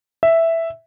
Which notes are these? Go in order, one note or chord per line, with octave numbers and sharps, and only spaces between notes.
E5